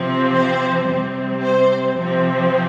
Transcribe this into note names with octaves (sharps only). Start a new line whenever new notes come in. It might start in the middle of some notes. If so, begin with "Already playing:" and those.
Already playing: C3 F3 C4
C5
C3 G3 C4
C5
C3 F3 C4